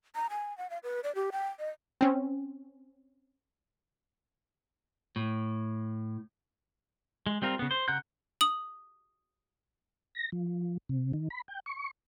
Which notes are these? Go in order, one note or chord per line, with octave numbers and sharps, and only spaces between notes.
A#5
G#5
F#5
F5
B4
D5
G4
G5
D#5
C4 C#4
A2
G#3
G3 C4 F4 A#4
C#3 B3
C5
C#3 F#5 A#5 F#6 G6
D#6 F#7
A#6
F3
C3
D#3
B5
G5
C#6